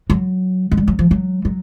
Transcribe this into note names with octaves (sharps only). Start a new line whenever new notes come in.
F#3
G#3
G3
F#3
F3
F#3
F#3